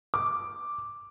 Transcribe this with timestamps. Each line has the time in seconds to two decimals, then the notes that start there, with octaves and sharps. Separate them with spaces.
0.14 D6